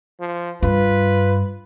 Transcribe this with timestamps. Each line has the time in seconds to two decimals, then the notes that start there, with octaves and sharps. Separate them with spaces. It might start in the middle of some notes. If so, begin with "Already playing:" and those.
0.20 F3
0.63 G2 F4 B4